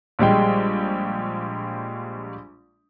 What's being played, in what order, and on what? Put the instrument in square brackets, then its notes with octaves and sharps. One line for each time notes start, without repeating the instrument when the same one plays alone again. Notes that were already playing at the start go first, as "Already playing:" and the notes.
[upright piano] A#1 G3 G#3 G5